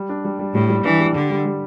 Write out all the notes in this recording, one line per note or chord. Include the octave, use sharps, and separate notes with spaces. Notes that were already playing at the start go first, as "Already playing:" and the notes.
Already playing: G3
D4
G3
G3
A2 G3
G3
E3 D4
G3
D3 G4
G3
G3